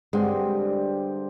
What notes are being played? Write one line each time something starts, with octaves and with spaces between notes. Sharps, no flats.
G2 D3 G#3 C4